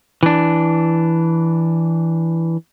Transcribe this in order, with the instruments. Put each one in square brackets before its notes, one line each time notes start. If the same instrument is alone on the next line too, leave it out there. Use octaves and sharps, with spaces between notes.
[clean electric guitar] E3 D4